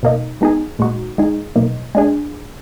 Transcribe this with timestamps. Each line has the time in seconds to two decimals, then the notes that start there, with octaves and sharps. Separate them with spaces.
0.03 B2 A#3 D#4
0.41 G#3 B3 D#4 G#4
0.79 A#2 G#3 D#4 F#4
1.18 G#3 D#4 G#4
1.56 B2 F#3 A#3 D#4
1.95 G#3 D4 G#4